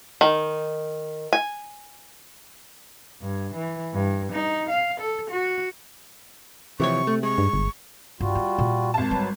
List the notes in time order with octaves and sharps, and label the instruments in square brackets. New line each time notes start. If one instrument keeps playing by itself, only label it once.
[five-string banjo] D#3
G#5
[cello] G2
E3
G2
D#4
F5
A4
F#4
[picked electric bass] C3 [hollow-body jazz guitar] E3 F3 C#5 [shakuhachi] C#6
[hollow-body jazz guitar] A3
[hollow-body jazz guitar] G#3 [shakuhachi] C#6
[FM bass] G2
G1
[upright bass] G2 [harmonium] G3 F4 F#4
[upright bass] D#4
A#2
[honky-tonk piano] G#1 A5
[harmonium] F#3 B4 [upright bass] G3